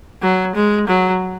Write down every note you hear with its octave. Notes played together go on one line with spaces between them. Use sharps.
F#3
G#3
F#3